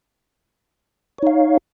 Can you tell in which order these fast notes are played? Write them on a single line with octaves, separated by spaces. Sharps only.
C#5 D#4 F5